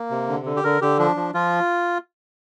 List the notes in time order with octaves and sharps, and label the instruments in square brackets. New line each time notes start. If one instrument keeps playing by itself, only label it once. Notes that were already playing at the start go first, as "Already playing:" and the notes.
Already playing: [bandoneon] A#3
C3
D3
D3
G4
D3 A#4
D3 G4
F3 D4
F3
F3 F4